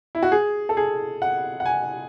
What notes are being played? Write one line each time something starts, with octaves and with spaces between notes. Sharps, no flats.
E4
F#4
G#4
A4
G#4
F#5
F#5
G#5